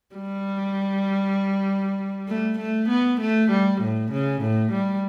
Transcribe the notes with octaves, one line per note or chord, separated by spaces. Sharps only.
G3
A3
A3
B3
A3
G3
A2
C#3
A2
G3